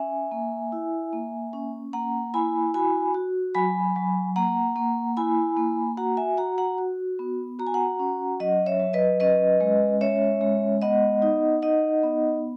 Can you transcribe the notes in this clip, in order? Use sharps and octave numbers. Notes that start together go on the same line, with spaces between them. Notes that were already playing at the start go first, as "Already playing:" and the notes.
Already playing: C#4 E5 G#5
A#3
E4
A#3
C#4
A#3 F#5 A#5
E4 G#5 B5
F#4 G#5 B5
F#4
F#3 G#5 B5
F#3
A#3 F#5 A#5
A#3
E4 G#5 B5
A#3
F#4 F#5 A#5
E5 G#5
F#4 F#5 A#5
F#5 A#5
F#4
B3
F#4 A#5
G#5
F#5 A#5
C#4
F#3 D#5 F#5
C#5 E5
F#3
B4 D#5
C#4 B4 D#5
G#3
C#4 C#5 E5
G#3
B3 D#5 F#5
D#4
D#4 D#5 F#5
B3